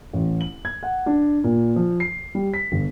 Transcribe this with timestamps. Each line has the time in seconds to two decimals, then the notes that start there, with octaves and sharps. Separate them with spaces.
0.13 A1
0.41 F#7
0.65 G#6
0.83 F#5
1.06 D4
1.44 A#2
1.76 F3
2.00 C7
2.35 G3
2.54 B6
2.72 G1